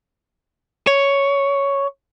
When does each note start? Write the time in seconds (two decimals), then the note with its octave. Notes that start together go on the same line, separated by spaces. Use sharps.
0.87 C#5